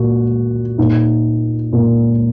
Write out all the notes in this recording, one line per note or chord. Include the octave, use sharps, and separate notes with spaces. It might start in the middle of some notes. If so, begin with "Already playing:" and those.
Already playing: A#2 F#4
A#2 D#4
A#2